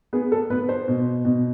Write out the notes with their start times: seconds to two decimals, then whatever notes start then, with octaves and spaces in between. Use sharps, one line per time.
0.13 B3 G#4
0.32 A4
0.50 B3 B4
0.69 C5
0.88 B2
1.25 B2